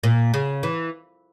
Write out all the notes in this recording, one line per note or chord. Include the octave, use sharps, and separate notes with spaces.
A#2
C#3
E3